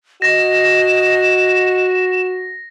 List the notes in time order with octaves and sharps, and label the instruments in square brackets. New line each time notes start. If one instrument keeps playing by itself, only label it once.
[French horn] F#4 [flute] D#5 [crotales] A#6 [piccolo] E7